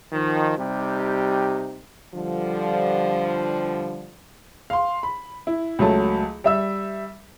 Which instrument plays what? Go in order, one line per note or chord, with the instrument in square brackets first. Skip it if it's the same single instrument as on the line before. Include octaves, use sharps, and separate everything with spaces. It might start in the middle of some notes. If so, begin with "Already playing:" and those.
[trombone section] D#3 F3
C3 G3 D#4 G4
[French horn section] D3 F3 G3
[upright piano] F5 C6
B5
E4
C#2 F#3 A3 A5
G3 E5 E6